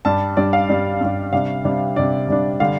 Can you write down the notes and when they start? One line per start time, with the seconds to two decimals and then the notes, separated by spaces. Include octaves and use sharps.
0.05 G2 G3 D4 A5
0.37 G2 G3 D4 D5
0.53 F5
0.69 G2 G3 D4
1.01 G2 G3 D4
1.33 C3 G3 D4 F5
1.64 C3 G3 D4
1.96 C3 G3 D4 D5
2.29 C3 G3 D4
2.60 D3 G3 D4 F5